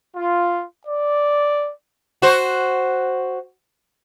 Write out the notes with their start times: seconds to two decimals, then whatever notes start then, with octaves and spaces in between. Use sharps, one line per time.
0.15 F4
0.87 D5
2.22 F#4 C5